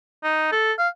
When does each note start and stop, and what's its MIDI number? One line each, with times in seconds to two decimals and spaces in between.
0.24 0.49 63
0.52 0.73 69
0.79 0.89 77